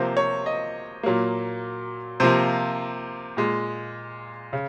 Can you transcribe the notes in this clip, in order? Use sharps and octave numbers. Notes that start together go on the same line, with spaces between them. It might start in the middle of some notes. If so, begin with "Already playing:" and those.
Already playing: C3 F3 A#3 C5
C#5
D#5
A#2 F#3 A#3
C3 F3 A#3 C5
A#2 G#3
C#3